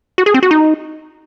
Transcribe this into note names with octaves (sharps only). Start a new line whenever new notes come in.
F#4
G#4
C4
F#4
D#4